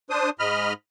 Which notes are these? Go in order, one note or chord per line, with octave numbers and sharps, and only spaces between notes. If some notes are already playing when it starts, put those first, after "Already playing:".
D4 C5 D#6
G#2 D#5 B5 F6